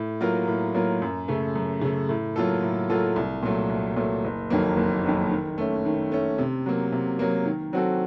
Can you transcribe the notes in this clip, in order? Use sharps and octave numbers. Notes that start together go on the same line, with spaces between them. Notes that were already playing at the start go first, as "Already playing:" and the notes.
Already playing: A2
F#3 A#3 F4 A#4
A2
F#3 A#3 F4 A#4
F#2
C#3 A3
F#2
C#3 A3
A2
F#3 A#3 F4 A4
A2
F#3 A#3 F4 A4
C2
A#2 F#3 A3
C2
A#2 F#3 A3
F#1
F2 D#3 F#3 A#3
F#1
F2 D#3 F#3 A#3
D#3
A3 C#4
D#3
A3 C#4
C3
F#3 A#3
C3
F#3 A#3
D#3
F#3 C4 F#4 A4